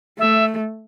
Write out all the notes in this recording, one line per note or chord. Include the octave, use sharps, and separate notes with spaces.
A3 E5